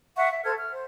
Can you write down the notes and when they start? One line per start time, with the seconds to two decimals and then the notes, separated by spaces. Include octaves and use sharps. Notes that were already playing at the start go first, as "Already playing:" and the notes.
0.16 E5 F#5 C#6
0.30 E5
0.44 A4 C5 F6 G#6
0.58 F6
0.72 C5